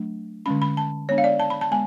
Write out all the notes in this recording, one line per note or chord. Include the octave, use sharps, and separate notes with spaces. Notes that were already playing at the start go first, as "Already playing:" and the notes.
Already playing: F#3 A3 D4
D3 G#3 C#4 B5
B5
A5
G#3 B3 D4 C#5
F5
D5
A5
B5
A5
G#3 B3 G#5